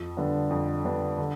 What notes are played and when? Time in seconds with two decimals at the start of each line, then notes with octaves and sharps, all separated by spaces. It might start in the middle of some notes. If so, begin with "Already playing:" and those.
Already playing: F2
0.17 D3 G3 B3 D4
0.50 F2
0.84 D3 G3 B3 D4
1.18 D3